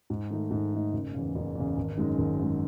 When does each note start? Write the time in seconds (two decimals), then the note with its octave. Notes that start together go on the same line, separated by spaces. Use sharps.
0.10 G#2
0.31 D#3 A3 D#4
0.51 G#2
0.73 D#3 A3 D#4
0.93 F#1
1.14 E2 C#3
1.36 F#1
1.55 E2 C#3
1.77 G#1
1.98 F#2 D#3 G#3
2.18 G#1
2.39 F#2 D#3 G#3